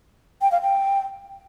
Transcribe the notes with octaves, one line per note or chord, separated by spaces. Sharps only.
G5
F5
G5